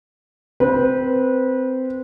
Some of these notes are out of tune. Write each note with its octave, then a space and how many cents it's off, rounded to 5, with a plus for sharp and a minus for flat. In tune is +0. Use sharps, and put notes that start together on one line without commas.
C4 -15 B4 -25